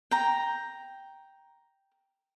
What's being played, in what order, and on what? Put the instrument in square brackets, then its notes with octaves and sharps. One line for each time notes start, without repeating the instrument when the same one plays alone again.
[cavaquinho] G5 A#5